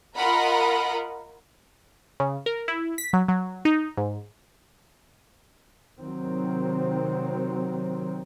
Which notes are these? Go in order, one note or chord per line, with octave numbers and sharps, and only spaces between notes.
F4 A#4 D#5 F#5 A#5 B5
C#3
A#4
E4
B6
F#3
F#3
D#4
G#2
C3 D#3 F#3 C4